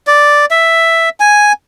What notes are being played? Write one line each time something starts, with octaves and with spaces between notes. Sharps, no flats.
D5
E5
G#5